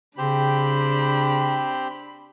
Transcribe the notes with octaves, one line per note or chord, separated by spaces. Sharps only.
C#3 C4 D4 G4 C5 B5